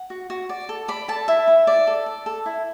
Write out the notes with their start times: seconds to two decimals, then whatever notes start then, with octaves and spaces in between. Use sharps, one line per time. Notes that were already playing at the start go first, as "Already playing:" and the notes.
Already playing: F#5
0.10 F#4
0.30 F#4
0.49 D5
0.69 A4
0.88 D5 B5
1.08 A4 A5
1.28 E4 E5
1.48 E4
1.67 D5
1.87 A4
2.06 D5
2.26 A4
2.46 E4